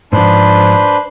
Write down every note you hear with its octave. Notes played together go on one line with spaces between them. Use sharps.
G#2 F3 D4 B4 C5